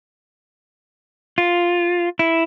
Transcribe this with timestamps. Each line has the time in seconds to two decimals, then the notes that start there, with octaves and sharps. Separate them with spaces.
1.38 F4
2.19 E4